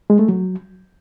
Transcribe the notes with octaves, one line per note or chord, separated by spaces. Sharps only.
G#3
A3
F#3